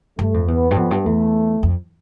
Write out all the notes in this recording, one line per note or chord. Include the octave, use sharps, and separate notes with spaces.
G2 A3
F2
E2 B3
G2
F2 B3
G2
E2 A3
F2